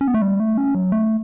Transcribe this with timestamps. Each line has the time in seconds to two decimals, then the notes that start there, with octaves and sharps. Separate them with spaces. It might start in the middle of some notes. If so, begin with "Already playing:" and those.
0.01 C#4
0.08 B3
0.14 A3
0.22 G3
0.40 A3
0.58 C#4
0.75 F#3
0.92 A3